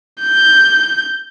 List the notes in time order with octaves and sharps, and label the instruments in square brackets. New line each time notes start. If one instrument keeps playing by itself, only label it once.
[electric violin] G6